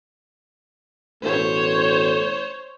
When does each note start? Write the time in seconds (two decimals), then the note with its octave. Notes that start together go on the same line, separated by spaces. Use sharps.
1.23 A1 B2 A3 C5 C#5